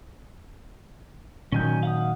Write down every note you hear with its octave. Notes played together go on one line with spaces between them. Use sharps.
A#2 D#3 F#3 C#4 G#5 G6
F5 F#5 D#6